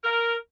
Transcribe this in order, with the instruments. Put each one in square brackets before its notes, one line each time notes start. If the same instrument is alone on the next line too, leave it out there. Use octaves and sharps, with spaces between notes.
[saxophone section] A#4